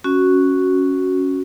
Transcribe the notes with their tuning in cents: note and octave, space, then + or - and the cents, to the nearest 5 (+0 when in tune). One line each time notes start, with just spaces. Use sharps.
C#4 +0 F#4 +0